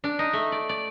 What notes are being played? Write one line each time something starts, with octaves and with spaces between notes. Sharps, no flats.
D4
D#4
A3
D5
D5